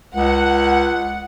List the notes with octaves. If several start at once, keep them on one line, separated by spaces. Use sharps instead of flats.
C#2 F#5